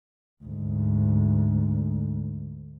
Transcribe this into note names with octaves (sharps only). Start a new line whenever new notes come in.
D2 G#2